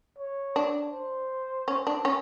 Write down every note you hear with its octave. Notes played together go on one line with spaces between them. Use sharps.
C#5
D4
C5
C#4
D4
C#4